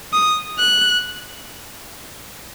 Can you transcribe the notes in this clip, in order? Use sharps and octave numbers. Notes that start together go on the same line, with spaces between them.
D#6
F#6